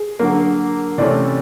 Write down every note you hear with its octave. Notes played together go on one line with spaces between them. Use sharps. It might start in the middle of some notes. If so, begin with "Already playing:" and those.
Already playing: G#4
D3 F#3 A#3
C3 E3 A3 C#4 D5